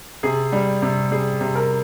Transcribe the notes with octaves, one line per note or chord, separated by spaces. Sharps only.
C3 G#4
G3
C3
G3 G#4
C3
A#4